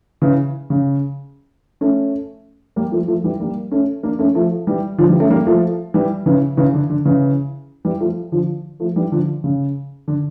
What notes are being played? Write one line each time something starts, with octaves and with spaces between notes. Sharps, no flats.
C#3 E3
C#3
A3 C#4
G3 A#3
F3 A3
F3 A3
E3 G3
G3 A#3
A3 C#4
A#3 D4
A3 C#4
F3 A3
E3 G3
D3 F3
E3 G3
A3 C#4
G3 A#3
F3 A3
E3 G3
C#3 E3
C#3 E3
D3
D3
C#3 E3
E3 G3
F3 A3
D3 F3
F3 A3
E3 G3
D3 F3
C#3
D3